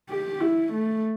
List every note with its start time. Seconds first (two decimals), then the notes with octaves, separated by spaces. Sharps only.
0.09 G4
0.41 E4
0.73 A3